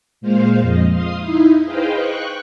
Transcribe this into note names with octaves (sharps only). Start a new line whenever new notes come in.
A#2 G#3 C5 F5
F2 D#5
F5 C6 D#6
D#4 E4
G#4 B4 C5 D#5 F5 G5
G5 C#6 F#6